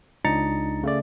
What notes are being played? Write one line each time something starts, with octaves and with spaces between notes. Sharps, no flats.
C#2 D4 D#4 A#5 A6 C#7
C#3 A3 D5